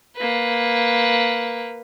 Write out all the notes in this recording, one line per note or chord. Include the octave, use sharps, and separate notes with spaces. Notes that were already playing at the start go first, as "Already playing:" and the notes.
A#3 B4